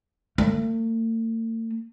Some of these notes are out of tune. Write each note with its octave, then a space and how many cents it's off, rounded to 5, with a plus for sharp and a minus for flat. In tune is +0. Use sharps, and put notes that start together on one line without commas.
A3 +45